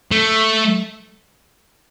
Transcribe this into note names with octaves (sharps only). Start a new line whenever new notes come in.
A3